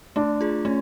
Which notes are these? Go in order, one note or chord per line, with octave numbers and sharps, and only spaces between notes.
A3 D4
F4 G#4
A3 C#4